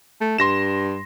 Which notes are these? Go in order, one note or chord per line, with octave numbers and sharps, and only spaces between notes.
A3
G2 C6 A#6 E7